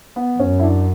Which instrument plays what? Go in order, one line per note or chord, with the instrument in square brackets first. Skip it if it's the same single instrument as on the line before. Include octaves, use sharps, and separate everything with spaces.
[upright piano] B3
[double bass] F#2 [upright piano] C#4
[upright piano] E4
D4